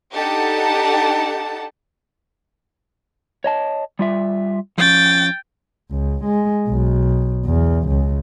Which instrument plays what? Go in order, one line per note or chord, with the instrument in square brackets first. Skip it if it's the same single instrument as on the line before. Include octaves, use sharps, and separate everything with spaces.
[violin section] D4 D#4 G4 A4 F#5 A5
[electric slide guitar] C#5 D#5 A5
G3 F4 E5
[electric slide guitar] F3 C#4 [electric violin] G5 A6
[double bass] C#2
G#3
B1
E2
C#2